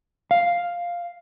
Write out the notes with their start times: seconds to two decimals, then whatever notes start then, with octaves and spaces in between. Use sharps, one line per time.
0.31 F5